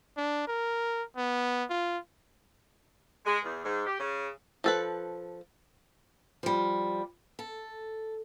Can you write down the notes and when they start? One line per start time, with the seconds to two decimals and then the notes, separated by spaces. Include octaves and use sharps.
0.17 D4
0.47 A#4
1.17 B3
1.70 F4
3.26 G#3
3.44 E2
3.64 G#2
3.86 G4
4.00 C#3
4.64 F3 A4 B4
6.43 F3 G3
7.39 A4